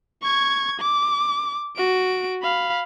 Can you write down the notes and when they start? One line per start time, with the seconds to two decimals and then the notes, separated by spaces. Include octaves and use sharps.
0.22 C#6 G#6
0.80 D6
1.76 F#4 D7
2.42 F5 B5